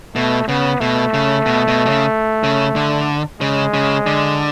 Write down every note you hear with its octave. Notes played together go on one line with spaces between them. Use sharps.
B2 A3
C#3 B3
B2 A3
C#3
B2
B2
B2
C#3
C#3
D3
C#3 G#3
C#3
D3